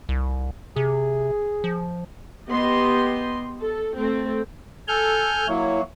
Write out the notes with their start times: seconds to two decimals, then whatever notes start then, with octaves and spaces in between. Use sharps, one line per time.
0.09 C2
0.76 C3 G#4
1.64 F3
2.49 B3 G4 D#5 C6
3.60 A4
3.97 A3 C4 A4
4.88 A4 G#5 F6 G6
5.48 F#3 A#3 E4 C#5